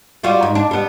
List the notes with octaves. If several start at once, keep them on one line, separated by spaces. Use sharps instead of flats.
G3 F4 F#4
G#2
D4
G3 B3